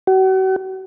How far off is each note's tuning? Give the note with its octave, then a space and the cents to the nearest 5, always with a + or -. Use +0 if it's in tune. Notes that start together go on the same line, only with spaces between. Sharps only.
F#4 +40